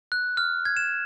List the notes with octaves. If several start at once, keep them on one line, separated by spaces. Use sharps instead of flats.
F#6
F6
G#6
E7